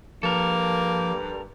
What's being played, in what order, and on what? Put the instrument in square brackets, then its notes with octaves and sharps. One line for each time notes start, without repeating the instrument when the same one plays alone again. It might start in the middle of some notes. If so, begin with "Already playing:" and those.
[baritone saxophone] G2 [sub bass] F3 [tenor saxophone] A#3 [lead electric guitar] A4 A#4